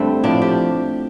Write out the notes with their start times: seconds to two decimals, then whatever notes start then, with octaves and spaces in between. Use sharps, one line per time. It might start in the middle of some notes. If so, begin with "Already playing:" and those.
Already playing: G2 D3 G3 A3 C4
0.23 A2 F3 D4
0.42 G4